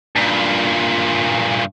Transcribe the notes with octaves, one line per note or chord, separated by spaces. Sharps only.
G2 A#2